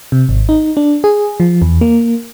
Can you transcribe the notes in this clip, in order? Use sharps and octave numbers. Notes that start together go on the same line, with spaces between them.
C3
G#1
D#4
D4
G#4
F3
E2
A#3